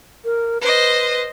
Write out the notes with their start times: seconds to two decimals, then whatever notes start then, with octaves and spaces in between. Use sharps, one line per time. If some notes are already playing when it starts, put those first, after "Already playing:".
0.25 A#4
0.61 B4 C5 D#5